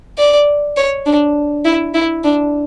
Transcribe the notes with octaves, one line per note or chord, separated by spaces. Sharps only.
D5
C#5
D4
E4
E4
D4